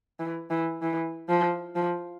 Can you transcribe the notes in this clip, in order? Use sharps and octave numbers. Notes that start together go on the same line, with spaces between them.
E3
E3
E3
F3
F3